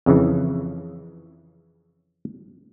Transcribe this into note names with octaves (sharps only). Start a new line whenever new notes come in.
F2 C#3 E3